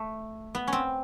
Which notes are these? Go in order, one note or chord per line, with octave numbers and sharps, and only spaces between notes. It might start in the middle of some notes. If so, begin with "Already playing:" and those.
Already playing: A3
B3
C#4
C4